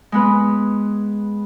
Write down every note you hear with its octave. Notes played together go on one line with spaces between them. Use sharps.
G#3 B3 B4